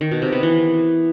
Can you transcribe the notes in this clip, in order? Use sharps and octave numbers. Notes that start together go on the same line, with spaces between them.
D#3
B2
C3
B3
E3